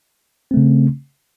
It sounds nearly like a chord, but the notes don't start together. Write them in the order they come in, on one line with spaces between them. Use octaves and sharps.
C4 A3 C#3